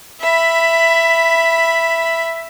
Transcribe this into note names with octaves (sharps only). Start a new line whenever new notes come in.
E5 B5